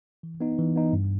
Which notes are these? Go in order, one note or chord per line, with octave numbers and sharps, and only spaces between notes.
E3
B3 D#4
E3
B3 D#4
G2